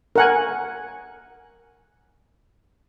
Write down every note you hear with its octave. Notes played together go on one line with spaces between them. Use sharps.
A#4 F#5 G#5